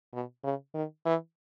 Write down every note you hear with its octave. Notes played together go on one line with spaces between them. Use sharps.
B2
C#3
D#3
E3